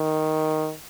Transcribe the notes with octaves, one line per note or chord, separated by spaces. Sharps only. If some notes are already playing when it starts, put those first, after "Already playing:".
Already playing: D#3